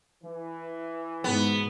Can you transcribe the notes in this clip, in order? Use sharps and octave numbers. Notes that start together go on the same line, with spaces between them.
E3
G#2 B2 B3